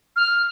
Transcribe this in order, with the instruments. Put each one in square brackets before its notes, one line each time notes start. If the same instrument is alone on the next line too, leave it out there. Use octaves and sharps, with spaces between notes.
[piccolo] F6